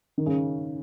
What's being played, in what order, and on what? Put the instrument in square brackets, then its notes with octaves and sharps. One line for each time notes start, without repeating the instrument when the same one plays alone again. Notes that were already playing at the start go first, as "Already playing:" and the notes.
[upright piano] D#3
C#3